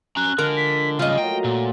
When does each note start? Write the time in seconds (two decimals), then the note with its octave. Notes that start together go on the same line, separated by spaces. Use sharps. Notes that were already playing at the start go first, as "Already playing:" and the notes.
0.17 C#4 A#5 F#6
0.38 D3 F3 G#3 A#4 A#5
0.57 B6
0.99 C#3 G3 F4 D#5 F5
1.18 F#3 A3 A#3 G5 A#5
1.44 A#2